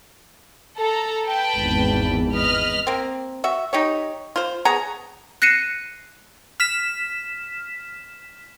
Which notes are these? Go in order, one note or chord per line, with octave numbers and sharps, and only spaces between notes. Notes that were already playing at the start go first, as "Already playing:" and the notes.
A4 A#5
B4 G5 A5
G#1 E2
B4 D#5 F6
A#3 C4
F#4 E5
D#4 G4 C#5
F4 C5
B3 G#4 C#5 A#5
F#6 A#6 C7 C#7 D#7 E7
F6 B6 E7